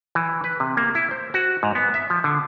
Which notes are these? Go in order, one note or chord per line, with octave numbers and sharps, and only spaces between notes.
E3
B4
C3
A#3
E4
C5
F#4
G#2
B3
E5
F3
D3